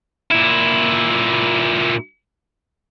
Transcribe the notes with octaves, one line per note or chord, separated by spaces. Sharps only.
A#2 E4